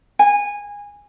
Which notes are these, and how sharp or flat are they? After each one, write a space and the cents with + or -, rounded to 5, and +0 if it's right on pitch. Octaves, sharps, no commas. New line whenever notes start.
G#5 -20